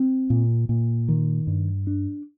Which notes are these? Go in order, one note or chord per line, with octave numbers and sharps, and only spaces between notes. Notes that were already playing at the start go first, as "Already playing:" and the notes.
Already playing: C4
A#2
A#2
D#3
G2
D4